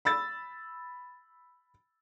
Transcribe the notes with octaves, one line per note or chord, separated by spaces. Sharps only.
B5 E6 A6